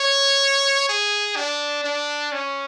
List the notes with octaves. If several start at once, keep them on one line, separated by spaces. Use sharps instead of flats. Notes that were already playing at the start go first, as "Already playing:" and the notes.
Already playing: C#5
G#4
D4
D4
C#4